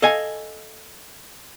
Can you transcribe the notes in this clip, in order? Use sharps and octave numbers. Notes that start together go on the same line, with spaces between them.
A4 D#5 F5 G#5